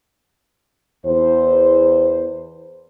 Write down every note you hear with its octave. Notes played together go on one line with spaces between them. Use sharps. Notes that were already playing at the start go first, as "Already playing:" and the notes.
E2 C5